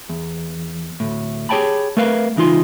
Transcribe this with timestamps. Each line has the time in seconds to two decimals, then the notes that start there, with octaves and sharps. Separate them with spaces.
0.09 E2
1.00 D2 A2
1.49 G4 G#4 C#5 G5 A5 B5
1.97 A3 A#4 B4 F5
2.36 C#2 E3 D#4 F4 C6